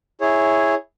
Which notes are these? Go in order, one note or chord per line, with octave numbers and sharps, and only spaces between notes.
E4 G#4 C#5